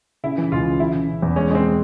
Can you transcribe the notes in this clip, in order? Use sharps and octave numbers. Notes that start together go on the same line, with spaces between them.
C#3 E4
E3
C#2 F4
C#3
E3 E4
C#3
C#3
E2
G#3 C#4
G#3 C4